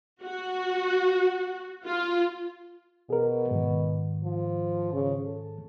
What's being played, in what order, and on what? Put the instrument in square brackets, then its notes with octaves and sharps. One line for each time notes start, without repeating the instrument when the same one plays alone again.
[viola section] F#4
F4
[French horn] B2 [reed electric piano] G#4 A#4
[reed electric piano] G#2 D#3
[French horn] F3
C#3
A4